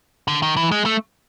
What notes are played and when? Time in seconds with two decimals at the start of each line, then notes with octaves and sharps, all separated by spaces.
0.28 D3
0.42 D#3
0.57 E3
0.71 G#3
0.86 A3